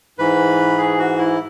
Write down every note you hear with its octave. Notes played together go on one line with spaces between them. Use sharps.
G#2 E3 B4
G#4
F#4
E4